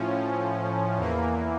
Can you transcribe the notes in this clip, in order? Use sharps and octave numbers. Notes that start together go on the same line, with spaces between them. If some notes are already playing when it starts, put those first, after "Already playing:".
Already playing: A2 F3 C#4
E2 E3 A#3